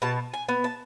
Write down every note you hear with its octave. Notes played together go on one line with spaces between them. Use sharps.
B2 A5
G#5
B3
A5